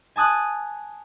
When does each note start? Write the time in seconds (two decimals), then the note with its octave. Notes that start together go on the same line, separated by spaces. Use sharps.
0.16 G#5 A5 D#6 F#6